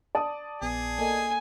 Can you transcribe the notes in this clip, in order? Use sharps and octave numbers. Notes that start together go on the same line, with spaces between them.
D5 A5 D#6
A#1 B3 G#4
A#3 A4 D#5 G#5